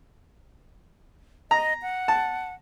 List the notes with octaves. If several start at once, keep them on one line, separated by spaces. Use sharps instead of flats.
D#5 A#5
F#5
A5